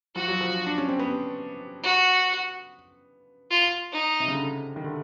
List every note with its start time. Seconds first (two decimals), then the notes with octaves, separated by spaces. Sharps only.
0.16 F3 F#4
0.28 F#3
0.41 F3
0.66 D4
0.78 C#4
0.88 C4
0.99 B3
1.83 F#4
3.51 F4
3.92 D#4
4.20 C3
4.28 C#3
4.34 D3
4.76 D#3
4.84 D3